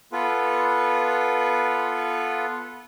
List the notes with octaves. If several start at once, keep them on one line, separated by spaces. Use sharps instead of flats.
B3 F4 A4 B4